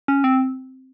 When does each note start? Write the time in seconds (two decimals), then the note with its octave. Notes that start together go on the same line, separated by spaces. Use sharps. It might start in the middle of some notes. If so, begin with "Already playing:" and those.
0.08 C#4
0.24 C4